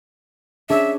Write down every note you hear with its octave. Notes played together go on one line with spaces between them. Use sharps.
C#4 D4 G#4 E5